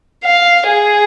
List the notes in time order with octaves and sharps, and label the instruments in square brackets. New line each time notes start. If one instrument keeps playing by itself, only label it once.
[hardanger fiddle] F5
G#4